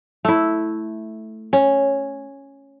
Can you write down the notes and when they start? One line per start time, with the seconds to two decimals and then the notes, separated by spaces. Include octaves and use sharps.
0.25 A3 E4
1.53 C#4